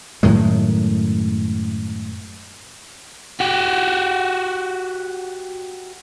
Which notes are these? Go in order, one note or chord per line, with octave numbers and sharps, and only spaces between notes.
F#2 A2 D#3 G#3
F#4 G4